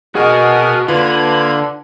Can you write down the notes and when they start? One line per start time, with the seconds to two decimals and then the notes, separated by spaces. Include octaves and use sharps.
0.15 B2 F#4 G#4 A#4 D#5 F#5 G#5
0.88 D3 A#3 F4 B4 B5 G#6